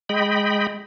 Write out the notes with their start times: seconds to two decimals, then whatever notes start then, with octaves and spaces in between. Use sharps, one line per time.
0.09 G#3 D#5 G5 B5